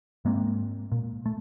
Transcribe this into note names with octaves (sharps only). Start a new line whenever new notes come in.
G#2 G#3 A#3 C4
A#2
A3